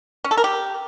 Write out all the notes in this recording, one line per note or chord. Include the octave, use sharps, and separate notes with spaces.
C#4
A4
A#4
G4